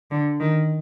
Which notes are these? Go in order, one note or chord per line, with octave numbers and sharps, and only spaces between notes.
D3
D#3